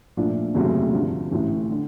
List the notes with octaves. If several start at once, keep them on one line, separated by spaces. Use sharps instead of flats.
A#2 F3 A3 D4 F4
F1 D#2 C#3 F#3 A3
G2 D3 F3
A1 A2 E3
D3